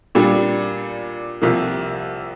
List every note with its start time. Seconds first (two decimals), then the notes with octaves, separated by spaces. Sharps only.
0.15 A#2 G3 D4
1.42 C2 C3 F3 A#3